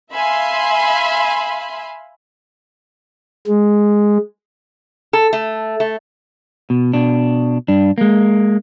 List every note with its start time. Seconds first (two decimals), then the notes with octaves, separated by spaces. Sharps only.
0.13 E5 F5 G#5 B5 C6
3.47 G#3
5.13 A4
5.33 A3
5.80 A3
6.70 B2
6.93 B2 D4
7.68 G2 D4
7.98 G#3 A#3